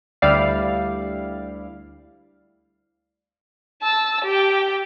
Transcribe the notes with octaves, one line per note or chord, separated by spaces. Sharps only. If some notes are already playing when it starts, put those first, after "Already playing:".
D2 G3 E4 D5 F5
A5 E6
G4 G5